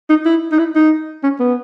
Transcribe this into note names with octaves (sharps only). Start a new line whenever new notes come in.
D#4
E4
D#4
E4
D#4
C#4
B3